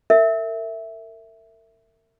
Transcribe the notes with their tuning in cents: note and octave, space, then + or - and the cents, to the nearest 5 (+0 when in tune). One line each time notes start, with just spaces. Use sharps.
A#4 -40 E5 +0